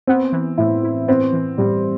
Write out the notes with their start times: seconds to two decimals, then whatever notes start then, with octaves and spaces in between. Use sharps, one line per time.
0.07 B3 C4
0.32 E3
0.58 A2 E4
0.83 E4
1.08 B3 C4
1.33 E3
1.58 A2 G3